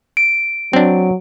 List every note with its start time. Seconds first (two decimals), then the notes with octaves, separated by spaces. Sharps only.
0.17 D7
0.73 F#3 C4 D4